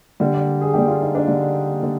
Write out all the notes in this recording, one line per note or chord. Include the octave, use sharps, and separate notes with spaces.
D3 G3
D5
G#4
D3 G3 G4
F4
D#4
D4
D3 G3
D3